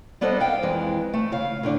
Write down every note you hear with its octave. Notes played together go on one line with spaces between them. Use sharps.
G3 B3 D4 A4 C5 D#5
F5 G5
F2 E3 G#3
A3 E4
C#3 F5
A2 D3 D4